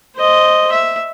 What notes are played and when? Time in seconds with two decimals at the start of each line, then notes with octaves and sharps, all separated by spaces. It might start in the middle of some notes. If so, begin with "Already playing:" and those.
0.16 C5 D#5
0.72 E5